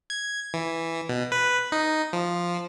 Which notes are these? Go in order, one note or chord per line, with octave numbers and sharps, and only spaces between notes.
G#6
E3
B2
B4
D#4
F3